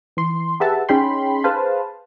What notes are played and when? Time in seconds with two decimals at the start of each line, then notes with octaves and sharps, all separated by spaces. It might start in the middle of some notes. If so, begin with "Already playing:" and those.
0.17 E3 C6
0.60 G4 G#4 B4 E5 F#5 A5
0.89 C#4 D#4 G#4 G5 B5 C6
1.44 G#4 B4 C5 F5 A5